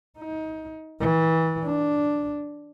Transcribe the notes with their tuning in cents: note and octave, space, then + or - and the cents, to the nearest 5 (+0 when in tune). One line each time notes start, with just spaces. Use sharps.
D#4 +25
E3 -30
D4 +0